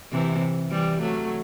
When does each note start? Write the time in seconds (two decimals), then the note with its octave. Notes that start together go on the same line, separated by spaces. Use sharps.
0.12 C3 E3
0.71 E3 G3
1.01 F#3 A3